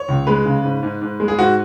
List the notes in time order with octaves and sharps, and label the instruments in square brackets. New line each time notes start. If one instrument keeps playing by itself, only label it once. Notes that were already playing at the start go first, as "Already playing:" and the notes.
Already playing: [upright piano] C#5
C#2
G#3 B4
C#3
G#2
G#2
G#2
G#3
G#4
G#2 F#4